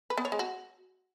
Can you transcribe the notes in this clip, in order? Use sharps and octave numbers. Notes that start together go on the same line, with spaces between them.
B4
B3
C#5
G#3
F#4